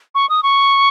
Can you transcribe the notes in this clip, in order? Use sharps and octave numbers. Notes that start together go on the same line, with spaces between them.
C#6
D#6
C#6